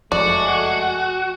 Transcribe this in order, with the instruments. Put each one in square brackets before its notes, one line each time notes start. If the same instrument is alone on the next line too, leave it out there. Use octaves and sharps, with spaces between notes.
[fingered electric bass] F#1 F2 F3 [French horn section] G#3 A3 [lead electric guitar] F#4 [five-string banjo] D5